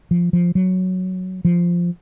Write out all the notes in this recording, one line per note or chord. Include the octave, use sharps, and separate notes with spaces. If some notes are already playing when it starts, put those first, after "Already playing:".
F3
F3
F#3
F3